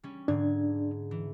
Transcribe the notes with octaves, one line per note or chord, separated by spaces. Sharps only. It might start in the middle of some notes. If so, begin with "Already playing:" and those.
G3 C#4
G#2 D3 D4 G#6
E3